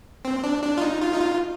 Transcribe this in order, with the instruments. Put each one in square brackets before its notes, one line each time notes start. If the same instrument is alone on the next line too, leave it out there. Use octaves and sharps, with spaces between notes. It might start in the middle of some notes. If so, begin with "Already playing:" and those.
[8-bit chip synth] C4
D4
D4
F4
D#4
F4
D#4
F4